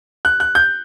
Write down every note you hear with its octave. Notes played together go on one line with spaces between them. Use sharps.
F#6
F#6
G6